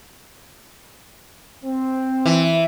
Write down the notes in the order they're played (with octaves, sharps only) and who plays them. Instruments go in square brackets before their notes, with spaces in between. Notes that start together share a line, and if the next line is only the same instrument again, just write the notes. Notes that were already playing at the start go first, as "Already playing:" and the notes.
[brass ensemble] C4
[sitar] E3